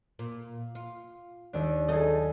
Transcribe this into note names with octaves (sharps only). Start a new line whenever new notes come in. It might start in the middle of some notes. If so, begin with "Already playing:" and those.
A#2
F4
D#2 D4
F#3 D#4 G#4 A4 D#5